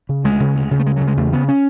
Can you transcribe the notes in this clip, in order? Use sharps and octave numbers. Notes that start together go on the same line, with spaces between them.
C#3
D2 G#3
C#3
D2
C#3
A3
D2 G#3
F#3
C#3
G#3
E2 A3
C#3 B3
C#4